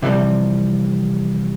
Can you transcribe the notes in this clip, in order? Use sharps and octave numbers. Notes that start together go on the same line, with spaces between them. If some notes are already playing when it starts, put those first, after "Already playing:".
C3 E3 F3 G3 C4